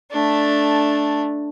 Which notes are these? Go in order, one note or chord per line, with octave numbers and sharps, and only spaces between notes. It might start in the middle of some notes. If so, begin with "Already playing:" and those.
A3 D4